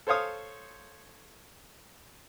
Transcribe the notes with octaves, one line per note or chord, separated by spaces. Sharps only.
A4 C5 C#5 F5 D#6